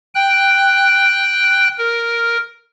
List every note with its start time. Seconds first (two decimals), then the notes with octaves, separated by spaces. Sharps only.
0.15 G5 F#6
1.78 A#4